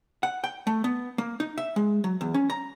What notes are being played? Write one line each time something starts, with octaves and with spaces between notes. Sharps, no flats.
F#5
G5
A3
B3
A#3
D#4
E5
G#3
F#3
E2
C#4
A#5